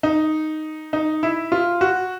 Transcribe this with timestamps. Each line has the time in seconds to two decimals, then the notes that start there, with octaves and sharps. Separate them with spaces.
0.03 D#4
0.93 D#4
1.23 E4
1.52 F4
1.81 F#4